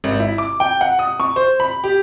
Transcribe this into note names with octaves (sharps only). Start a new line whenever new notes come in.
G#1
E4
D6
G5
F#5
D#6
C#6
C5
B5
G4